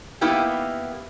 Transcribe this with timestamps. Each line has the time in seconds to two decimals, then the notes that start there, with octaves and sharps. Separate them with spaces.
0.21 A#3 B3 D#4 E4 G4